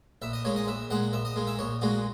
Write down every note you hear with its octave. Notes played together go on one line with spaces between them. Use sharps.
A#1 E5
D#5
A#2 G#3 C#5
D#5
A#1 E5
A#2 G#3 F#5
A#1 E5
D#5
A#2 G#3
E5
A#1 C#5
A#2 G#3 F#4